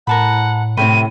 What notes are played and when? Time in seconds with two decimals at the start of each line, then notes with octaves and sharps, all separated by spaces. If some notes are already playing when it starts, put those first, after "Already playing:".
0.07 A2 A#4 F#5 A5 B5
0.77 A2 C3 C4 G5 B5 D#7